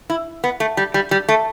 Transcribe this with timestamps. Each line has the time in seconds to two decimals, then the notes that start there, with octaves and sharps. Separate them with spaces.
0.10 E4
0.44 B3
0.60 A3
0.77 G3
0.94 G3
1.11 G3
1.29 A3